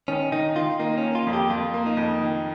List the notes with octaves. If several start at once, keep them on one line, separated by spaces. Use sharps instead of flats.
D#3 C#4
D#3 D#4
D#3 F4
A#3 D#4
C#4
A#3
F4
F2
G4
F2 F4
A#3
D#4
F2
D#3